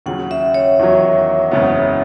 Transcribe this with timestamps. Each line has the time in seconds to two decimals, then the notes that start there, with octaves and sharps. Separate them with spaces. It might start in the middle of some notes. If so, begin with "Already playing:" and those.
0.06 D#2 C#3 F#3 F#5
0.31 E5
0.54 C#5
0.79 E2 D#3 F#3
1.51 F#1 E2 C#3 G#3 B3